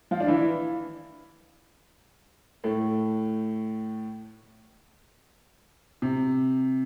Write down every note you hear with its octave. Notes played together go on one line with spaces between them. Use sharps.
F3 F4
D4
E3 E4
A2 A3
C3